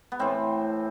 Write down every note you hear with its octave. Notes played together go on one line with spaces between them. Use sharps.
B3
A2 E3 C4